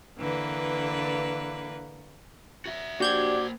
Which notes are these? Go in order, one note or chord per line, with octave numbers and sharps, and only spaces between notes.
D3 E3 A#3 B4
F#4 E5
A#3 D4 F#4 G4 C5 D5 G6 G#6